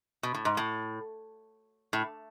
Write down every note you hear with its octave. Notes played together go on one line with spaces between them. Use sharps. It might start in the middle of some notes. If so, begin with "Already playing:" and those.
B2
A2
G#2
A2
A2